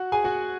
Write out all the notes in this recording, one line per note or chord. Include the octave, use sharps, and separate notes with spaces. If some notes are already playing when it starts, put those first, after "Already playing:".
Already playing: F#4 F#5
G#4 G#5
F#4 F#5